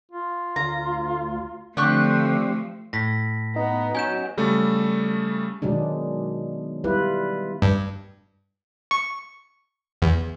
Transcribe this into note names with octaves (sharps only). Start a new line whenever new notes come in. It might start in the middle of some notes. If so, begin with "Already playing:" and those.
F4
D2 A#5
D3 F3 A3 C4 D4 G4 C#6
A2 A#6 B6
B3 D#4
F#3 C#4 G#5 G6 E7
C#3 G3 A3
B2 D#3 F#3 G#3 D4
G3 E4 F4 B4
G2
C#6
E2